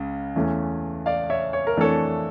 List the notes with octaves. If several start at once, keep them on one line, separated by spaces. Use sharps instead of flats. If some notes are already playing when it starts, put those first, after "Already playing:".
Already playing: C#2 C#3
E2 E3 A3 C#4
D5 F5
C#5 E5
C#5
A#4
F2 E3 A3 D4 A4 C#5